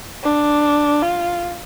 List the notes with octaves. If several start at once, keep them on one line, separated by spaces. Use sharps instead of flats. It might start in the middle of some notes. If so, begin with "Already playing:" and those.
D4
F4